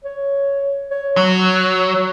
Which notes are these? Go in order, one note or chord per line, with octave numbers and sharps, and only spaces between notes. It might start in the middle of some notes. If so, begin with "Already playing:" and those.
C#5
C#5
F#3 C#6